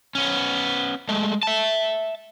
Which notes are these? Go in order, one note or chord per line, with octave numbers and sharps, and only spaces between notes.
B3 C#4
G#3 A3
E5 A5